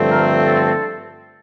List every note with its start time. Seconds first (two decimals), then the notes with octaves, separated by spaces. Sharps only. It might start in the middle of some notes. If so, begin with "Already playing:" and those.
Already playing: G2 D3 F3 A3 C4
0.10 A#4
0.45 A4